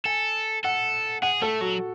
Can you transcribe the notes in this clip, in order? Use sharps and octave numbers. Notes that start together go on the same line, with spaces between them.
A4 G#5
A4 F#5
G#4 F#5
A3 A4
F#3 F#4